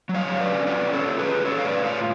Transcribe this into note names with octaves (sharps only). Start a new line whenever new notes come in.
F#3
C#5 F5
D3
B4 D5
C#4
F4 B4 D5
C#4
A4 C#5
F4
G#4 B4
F4
C#4 A4 C#5
F5
A2 B4 D5
F4 C#5 F5